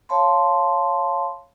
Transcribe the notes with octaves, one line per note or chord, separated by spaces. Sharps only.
C#5 F5 A5 B5 C6